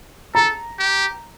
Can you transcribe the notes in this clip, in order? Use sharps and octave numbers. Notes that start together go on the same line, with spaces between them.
A4 A#5
G4